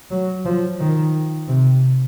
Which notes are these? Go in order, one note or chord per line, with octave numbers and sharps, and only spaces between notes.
F#3
F3
D#3
C3